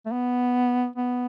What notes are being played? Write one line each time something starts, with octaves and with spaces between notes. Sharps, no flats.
A3
B3
B3